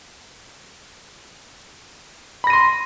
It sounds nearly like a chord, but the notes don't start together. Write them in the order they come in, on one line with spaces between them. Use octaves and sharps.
B5 A#6 D#7 C6